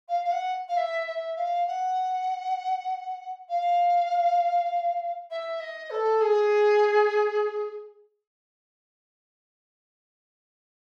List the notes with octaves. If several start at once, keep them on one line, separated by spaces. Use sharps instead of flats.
F5
F5
F#5
F5
E5
E5
F5
F#5
F5
E5
D#5
A4
G#4